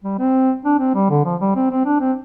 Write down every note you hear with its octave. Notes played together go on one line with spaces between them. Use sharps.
G3
C4
D4
C4
G3
D3
F3
G3
C4
C4
D4
C4